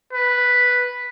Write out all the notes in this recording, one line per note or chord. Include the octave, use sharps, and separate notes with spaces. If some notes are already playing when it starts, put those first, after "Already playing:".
B4